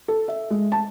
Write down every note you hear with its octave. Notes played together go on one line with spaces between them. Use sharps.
A4
E5
G#3
A5